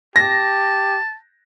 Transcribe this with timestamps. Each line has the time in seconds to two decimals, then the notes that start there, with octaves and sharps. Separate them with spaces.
0.16 G4 A5 A#6